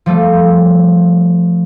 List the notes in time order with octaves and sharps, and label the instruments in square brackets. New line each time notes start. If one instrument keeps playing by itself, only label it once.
[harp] F3 G3 A3